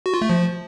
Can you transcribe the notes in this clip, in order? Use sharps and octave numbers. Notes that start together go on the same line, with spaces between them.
F#4
F4
A3
F3